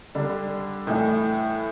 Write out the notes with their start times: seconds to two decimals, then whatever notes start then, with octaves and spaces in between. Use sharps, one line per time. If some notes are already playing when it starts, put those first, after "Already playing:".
0.15 D3 G3 D4
0.87 A2 E3 A3 E4